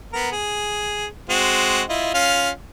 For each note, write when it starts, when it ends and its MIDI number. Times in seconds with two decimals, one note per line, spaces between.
0.13 0.30 59
0.13 0.30 70
0.32 1.06 68
1.30 1.83 56
1.30 1.83 60
1.30 1.83 66
1.89 2.11 64
1.89 2.11 65
1.89 2.11 75
2.14 2.50 61
2.14 2.50 65
2.14 2.50 77